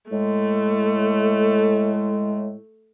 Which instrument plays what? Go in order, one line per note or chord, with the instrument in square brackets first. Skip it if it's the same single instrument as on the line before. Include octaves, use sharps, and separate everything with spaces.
[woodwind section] A2 G#3 [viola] A3